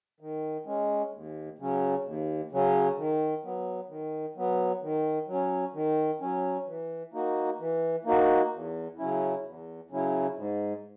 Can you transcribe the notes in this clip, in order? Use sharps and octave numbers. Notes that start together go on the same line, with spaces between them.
D#3
G#3 C#4
D#2
C#3 F#3 C#4
D#2
C#3 F#3 C#4
D#3
F#3 B3
D#3
F#3 B3
D#3
F#3
C#4
D#3
F#3 C#4
E3
A#3 D#4 F#4
E3
A#3 D#4 F#4
E2
C#3 F#3 C#4 E4
E2
C#3 F#3 C#4 E4
G#2